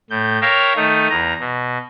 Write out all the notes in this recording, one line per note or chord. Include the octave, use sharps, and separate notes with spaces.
A2 G6
A#4 C#5 E5 F5 G5 A#5
D#3 A3 D#4
E2 A#5
B2